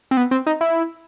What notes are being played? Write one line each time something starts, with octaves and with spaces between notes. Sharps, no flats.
C4
B3
C4
D#4
E4